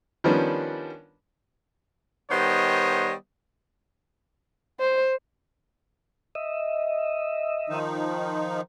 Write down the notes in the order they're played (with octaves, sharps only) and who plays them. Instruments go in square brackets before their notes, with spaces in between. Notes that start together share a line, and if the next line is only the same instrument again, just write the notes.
[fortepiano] D#3 F3 G3 B3 C#4 D4
[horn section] D#3 G3 B3 C5 C#5 D#5
[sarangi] C5
[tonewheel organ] D#5 E5
[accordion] D#3 F3 D#4